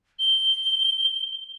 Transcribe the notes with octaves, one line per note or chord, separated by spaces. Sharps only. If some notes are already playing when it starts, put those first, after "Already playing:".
G7